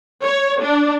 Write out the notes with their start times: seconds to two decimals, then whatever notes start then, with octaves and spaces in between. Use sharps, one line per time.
0.22 C#5
0.60 D4